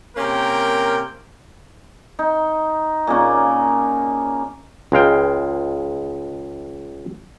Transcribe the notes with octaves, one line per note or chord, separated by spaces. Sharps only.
C3 A#3 C#4 A#4 G5
D#4
A#2 C#3 A#3 C#4
C#2 G#3 F5 G5